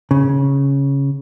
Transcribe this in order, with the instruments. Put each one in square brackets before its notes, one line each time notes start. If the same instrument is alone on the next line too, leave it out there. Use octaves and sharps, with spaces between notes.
[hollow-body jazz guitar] C#3